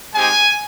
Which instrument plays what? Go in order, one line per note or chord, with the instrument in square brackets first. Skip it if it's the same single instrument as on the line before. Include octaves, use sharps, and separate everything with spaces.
[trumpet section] G#3 C4 D#4 G4 G#5